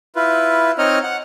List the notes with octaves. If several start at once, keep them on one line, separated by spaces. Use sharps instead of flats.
E4 F4 B4
C4 D#4 C#5 D#5 F6
F#5